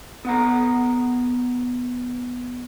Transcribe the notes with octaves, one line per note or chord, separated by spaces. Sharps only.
B3 F#5 A#5